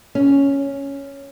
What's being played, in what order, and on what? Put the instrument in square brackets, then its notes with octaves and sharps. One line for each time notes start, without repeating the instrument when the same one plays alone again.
[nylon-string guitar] C#4